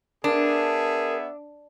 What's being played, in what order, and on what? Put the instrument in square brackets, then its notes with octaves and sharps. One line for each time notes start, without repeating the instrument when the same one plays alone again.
[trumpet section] B3 G#4 E5 [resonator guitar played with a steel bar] D4 [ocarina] A#4